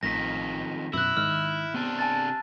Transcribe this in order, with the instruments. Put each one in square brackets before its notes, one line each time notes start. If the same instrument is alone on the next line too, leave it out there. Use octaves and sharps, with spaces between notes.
[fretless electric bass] A1 [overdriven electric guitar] F2 D#3 [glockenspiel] A#6 B6
[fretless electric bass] F#2 B2 [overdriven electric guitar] E4 [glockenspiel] E6 F#6
[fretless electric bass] G#2 D#3 [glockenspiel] F6
[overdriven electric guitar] C3 D4 [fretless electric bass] B3
[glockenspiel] G#5 A5 A6